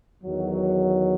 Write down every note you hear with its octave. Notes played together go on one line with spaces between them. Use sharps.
E2 D#3 F#3